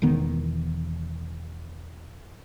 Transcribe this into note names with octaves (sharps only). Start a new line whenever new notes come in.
E1 E2 D#3 B3